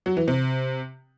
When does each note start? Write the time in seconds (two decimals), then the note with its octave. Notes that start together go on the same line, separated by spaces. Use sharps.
0.06 F#3
0.17 E3
0.28 C3